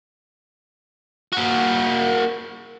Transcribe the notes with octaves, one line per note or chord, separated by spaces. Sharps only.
A#3 F#4